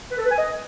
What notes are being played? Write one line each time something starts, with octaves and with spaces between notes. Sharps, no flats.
B4
A4
B4
G#5
D#5